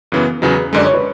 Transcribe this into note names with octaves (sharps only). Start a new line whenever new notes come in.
F#2 C#3 E3 B3
E2 C#3 F#3 G#4 B4
F#2 D3 G#3 D5
C#5
B4